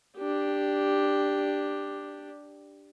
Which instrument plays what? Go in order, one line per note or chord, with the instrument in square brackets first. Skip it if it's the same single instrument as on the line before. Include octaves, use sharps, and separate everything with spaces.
[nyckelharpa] D4 G4